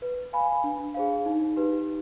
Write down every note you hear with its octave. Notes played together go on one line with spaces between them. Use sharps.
B4
F5 G#5 B5
D4
G#4 C5 F5
D#4
G4 B4